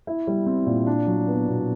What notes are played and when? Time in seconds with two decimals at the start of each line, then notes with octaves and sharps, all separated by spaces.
0.07 E4
0.27 G3
0.46 C4
0.67 A#2
0.87 D4
1.07 F#3
1.28 B3
1.48 B2